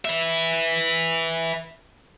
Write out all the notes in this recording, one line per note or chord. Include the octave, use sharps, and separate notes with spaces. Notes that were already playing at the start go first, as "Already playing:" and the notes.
B4 E5